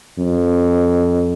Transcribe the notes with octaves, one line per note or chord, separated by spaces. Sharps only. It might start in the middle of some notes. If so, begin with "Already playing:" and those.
F2